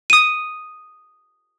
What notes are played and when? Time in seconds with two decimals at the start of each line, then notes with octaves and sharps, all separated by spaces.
0.10 D#6 D#7